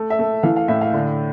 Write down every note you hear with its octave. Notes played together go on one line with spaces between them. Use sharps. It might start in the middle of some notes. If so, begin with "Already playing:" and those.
Already playing: A3
E5
A3
E3 F5
F5
A2 E5
F5
D3